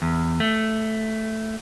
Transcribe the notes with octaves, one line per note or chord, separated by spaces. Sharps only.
E2
A3